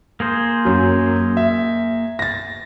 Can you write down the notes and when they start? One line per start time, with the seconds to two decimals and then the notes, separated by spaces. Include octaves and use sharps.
0.20 A#3 G#4 C5
0.65 F#2 F#3
1.37 E5
2.19 A6 A#6